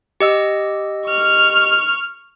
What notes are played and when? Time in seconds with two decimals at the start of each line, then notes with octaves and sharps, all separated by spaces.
0.20 G4 D#5 E6
1.07 C#6 F6